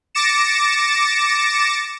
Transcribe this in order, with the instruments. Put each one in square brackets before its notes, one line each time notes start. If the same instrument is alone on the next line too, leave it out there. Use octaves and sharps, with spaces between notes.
[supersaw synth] D6 A6 A#6 C#7 E7